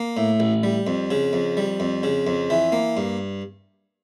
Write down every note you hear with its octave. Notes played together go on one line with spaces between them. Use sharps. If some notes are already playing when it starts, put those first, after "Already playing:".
Already playing: A#3
A2
A1
G3
F2
C#3
F2
G3
F2
C#3
F2
E3
A#3
G2